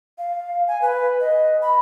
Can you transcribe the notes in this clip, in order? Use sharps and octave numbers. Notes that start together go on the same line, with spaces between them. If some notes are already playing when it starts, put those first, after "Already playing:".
F5
G#5
B4
D#5
B5